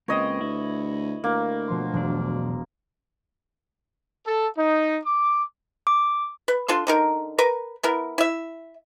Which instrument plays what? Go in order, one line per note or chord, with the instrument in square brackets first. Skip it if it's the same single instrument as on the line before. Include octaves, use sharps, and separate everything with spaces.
[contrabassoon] C#2 [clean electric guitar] A#3 C4 [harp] B4 [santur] C#5 D#5
[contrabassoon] D2 [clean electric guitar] E4
[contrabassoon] D2 [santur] A#3
[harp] B2 F3 C6
[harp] E1 [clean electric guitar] B1 D4
[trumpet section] A4
D#4
D6
[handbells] D6
[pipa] B4
D4 F4 A4 C6
D3 D#4 A#4
A#4 B4
B3 E4 A#4
E4 E5